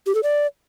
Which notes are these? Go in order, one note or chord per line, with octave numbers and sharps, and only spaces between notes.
G4
A4
D5